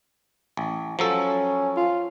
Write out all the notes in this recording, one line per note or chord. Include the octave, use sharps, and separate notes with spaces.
A1
F3 F#3 C#4 A4
F4